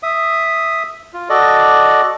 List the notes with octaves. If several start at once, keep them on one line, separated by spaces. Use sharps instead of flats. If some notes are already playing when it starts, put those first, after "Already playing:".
E5 D#6
F4
F#4 A4 D5 D#5